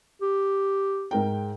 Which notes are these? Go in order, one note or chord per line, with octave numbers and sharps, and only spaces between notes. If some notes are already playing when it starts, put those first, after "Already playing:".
G4
G#2 A#4 G5